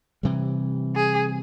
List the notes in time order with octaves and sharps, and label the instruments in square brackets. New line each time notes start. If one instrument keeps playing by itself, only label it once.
[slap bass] C3 E3 G3
[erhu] G#4